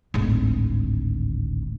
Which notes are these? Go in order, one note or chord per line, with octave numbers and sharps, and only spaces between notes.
D1 G#1